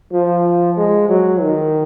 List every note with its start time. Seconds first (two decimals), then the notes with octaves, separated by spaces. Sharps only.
0.12 F3
0.77 G#3
1.09 F#3
1.42 D#3